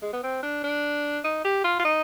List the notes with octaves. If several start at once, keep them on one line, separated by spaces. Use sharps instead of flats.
G#3
B3
C4
D4
D4
D#4
G4
F4
F4
D#4